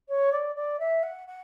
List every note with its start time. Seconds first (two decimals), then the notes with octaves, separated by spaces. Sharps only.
0.08 C#5
0.32 D5
0.56 D5
0.79 E5
1.03 F#5
1.27 F#5